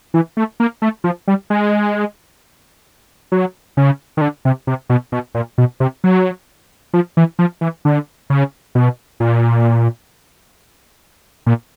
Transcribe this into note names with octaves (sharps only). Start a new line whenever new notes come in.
E3
A3
A#3
A3
F3
G3
G#3
F#3
C#3
D#3
D3
C3
C3
B2
B2
A#2
B2
C3
F#3
F3
E3
F3
E3
D3
C#3
B2
A#2
A#2